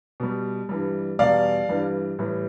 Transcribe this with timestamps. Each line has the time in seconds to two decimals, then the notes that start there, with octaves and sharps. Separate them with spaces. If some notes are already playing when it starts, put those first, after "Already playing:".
0.20 B2 G3
0.69 G2 E3 G3
1.19 E2 B2 G3 D5 F5
1.69 G2 E3 G3
2.19 A2 E3 G3